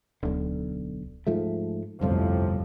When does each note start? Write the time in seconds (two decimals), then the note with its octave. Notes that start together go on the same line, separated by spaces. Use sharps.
0.23 D1 B1 D3
1.27 G#2 F3 A3
2.01 G1 C2 F2 A2 C3 F3